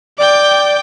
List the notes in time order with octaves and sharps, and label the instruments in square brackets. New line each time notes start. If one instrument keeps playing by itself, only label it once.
[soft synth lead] D5 [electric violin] G5 D6